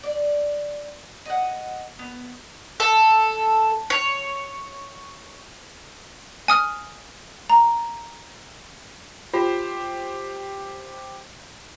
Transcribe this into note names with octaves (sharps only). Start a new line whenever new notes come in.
D5
D#5 F#5
B3
A4
C#5
G#5 D#6 F6
A#5
F4 G4 C5